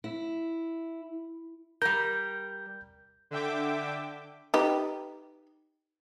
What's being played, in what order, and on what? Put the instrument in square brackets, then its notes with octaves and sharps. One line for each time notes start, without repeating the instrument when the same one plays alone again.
[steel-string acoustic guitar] E4
[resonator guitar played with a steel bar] G3 A#4 [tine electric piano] G6
[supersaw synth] D3 E5 G5 D6
[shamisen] D#4 G4 B4